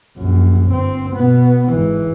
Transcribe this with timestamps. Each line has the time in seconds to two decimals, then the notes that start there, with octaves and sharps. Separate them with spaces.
0.18 A#1 F#2
0.71 G1 C4
1.15 B2 B3
1.70 G#1 E3